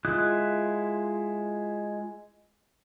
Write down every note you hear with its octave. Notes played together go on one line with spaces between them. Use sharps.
G#3 E4 F4 D#6 F#6